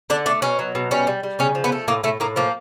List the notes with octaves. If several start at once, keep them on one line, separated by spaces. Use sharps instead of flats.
D3 D4
A3 D4
B2 C#4
F#3
B2
G3 C#4
G3
G3
C#3 C#4
F3
B3
A3
A2 A#3
A2 A3
A2 A#3
F3 A#3